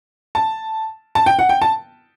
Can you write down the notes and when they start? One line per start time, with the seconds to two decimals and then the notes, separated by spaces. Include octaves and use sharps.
0.35 A5
1.15 A5
1.26 G5
1.39 F#5
1.49 G5
1.62 A5